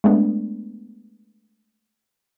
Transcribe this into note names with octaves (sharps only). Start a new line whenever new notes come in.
G#3 A3 B3 D4